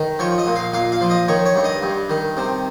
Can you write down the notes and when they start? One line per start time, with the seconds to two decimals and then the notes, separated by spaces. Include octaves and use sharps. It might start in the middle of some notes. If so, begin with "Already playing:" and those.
Already playing: D#3
0.19 F3 C#5
0.38 D#5
0.47 A#2
0.56 F5
0.73 A#2 F5
0.92 F5
1.01 F3
1.10 D#5
1.28 D#3 C#5
1.46 C#5
1.56 G2
1.64 D#5
1.82 G2
2.10 D#3
2.37 C3